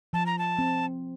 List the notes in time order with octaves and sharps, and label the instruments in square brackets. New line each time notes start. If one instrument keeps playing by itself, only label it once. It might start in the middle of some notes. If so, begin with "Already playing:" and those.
[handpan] F3 [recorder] A5
[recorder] A#5
A5
[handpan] C4